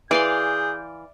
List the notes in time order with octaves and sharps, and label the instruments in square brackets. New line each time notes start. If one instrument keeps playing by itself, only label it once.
[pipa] E3 [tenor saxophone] G#4 [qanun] D5 F5 C6 [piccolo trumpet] G6